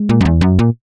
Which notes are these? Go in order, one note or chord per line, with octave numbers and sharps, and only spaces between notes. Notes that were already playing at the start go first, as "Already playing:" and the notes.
Already playing: G#3
A#2
F#2
E2
F#2
A#2